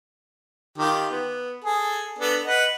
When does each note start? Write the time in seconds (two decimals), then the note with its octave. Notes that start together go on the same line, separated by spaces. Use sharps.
0.78 D#3 F4 G4
1.11 B3
1.64 G#4 A4
2.18 B3 D4 A4
2.45 B4 D#5 F#5